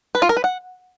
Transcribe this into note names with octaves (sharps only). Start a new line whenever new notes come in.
B4
F4
A#4
B4
F#5